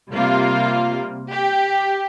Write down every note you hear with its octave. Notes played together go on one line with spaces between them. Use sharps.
C3 G3 A#3 F4
G4